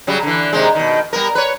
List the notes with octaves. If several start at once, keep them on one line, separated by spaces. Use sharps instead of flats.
C#3 F#3 G3
D3 E3
C3 D#3 G#3
B2 D#3
G3 B3 A#4
B4 C#5